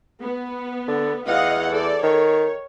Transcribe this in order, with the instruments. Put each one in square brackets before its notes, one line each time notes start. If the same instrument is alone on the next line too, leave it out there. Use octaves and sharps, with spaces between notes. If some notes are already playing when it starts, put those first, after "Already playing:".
[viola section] B3
[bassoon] D3
[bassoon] E2 [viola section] D#5 F5 F#5
[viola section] A4 D5
[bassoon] D#3 [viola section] C#5